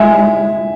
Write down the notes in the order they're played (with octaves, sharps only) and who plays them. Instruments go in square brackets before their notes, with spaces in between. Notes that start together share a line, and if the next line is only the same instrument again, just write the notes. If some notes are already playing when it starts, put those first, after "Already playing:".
Already playing: [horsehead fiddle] G#3 [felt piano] E5 G#5